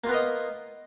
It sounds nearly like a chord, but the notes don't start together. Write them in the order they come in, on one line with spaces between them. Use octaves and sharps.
A#3 F4 B3 A#4 D#5